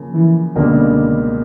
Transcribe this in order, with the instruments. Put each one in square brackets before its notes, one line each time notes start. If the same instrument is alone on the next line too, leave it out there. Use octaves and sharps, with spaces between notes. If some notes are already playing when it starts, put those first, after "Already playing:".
Already playing: [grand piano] C#3 F3 A#3
[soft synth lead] E3
[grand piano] C#2 B2 G3 A#3 [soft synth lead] D3